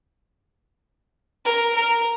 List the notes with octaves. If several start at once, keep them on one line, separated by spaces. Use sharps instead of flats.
A#4
A#4